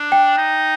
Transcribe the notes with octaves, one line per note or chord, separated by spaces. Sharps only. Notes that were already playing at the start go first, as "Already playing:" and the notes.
Already playing: D4
G5
D#4